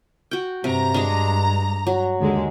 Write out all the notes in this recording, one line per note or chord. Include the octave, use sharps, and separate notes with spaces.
F#4 G5
G2 C3 A#5
G#3 D4
F#3
D#2 D3 G#3